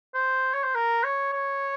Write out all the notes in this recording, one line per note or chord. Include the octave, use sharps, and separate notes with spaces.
C5
C#5
C5
A#4
C#5
C#5